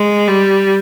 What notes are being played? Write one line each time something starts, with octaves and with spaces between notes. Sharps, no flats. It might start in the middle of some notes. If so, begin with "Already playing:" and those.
Already playing: G#3
G3